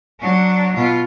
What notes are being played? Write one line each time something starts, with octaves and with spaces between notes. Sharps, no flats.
F#3 D4
B2 F4